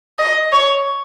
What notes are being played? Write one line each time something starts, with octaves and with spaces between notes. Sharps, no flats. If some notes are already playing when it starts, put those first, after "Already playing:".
D#5
C#5